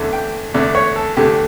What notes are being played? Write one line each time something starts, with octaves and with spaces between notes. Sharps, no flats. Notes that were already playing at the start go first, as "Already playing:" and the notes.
Already playing: E2 D3 A3
G5
E2 D3 A3 D5
C#5
A4
E2 D3 A3 G4